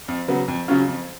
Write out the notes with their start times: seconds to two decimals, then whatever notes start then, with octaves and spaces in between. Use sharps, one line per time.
0.08 F2
0.28 C#3 F#3 B3
0.48 F2
0.68 C#3 F#3 C#4 F4
0.88 F2